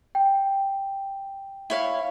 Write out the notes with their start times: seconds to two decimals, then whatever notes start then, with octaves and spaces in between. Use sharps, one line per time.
0.15 G5
1.70 E4 C#5 F5